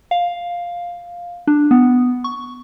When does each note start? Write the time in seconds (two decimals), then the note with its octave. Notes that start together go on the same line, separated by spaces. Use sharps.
0.11 F5
1.47 D4
1.71 B3
2.24 C#6